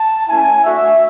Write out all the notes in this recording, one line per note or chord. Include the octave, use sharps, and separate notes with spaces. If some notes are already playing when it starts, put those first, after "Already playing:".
Already playing: A5
A3 C#4 E4 G#5
A3 D4 F#4 E5